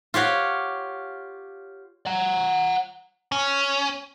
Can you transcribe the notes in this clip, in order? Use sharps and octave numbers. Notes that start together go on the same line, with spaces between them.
F4 G4 C#5 F#5 A#5
F#5 A#5
C#4